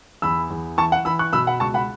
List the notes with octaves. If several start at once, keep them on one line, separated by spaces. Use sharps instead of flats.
E2 B5 E6
E2
E3 A5 C#6
F#5
E3 B5 E6
C#6 F#6
B2 B5 E6
F#5 B5
C#2 A5 C#6
F#5 B5